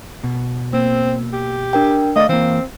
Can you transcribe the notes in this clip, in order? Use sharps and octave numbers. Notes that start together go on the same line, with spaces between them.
B2
A#3 C4
G4
D4 A#4 G5
A3 C5 D5 D#5 F5
E3 A#3 C4